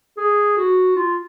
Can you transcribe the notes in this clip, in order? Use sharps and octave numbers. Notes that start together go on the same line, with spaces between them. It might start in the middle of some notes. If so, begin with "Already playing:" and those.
G#4
F#4
F4